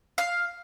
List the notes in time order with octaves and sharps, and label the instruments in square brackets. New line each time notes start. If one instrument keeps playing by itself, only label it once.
[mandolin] F5